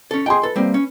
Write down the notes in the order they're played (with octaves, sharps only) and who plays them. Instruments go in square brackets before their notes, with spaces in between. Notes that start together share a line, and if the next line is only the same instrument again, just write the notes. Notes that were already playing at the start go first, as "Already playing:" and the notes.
[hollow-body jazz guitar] C#4 A4
[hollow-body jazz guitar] G#4 G5 [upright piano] D#5 G#5 C6
[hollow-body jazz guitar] A4 [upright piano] B4
[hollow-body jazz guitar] G3 A#3 C4
C#4